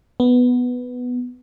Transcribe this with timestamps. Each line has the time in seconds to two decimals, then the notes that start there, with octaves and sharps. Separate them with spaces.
0.20 B3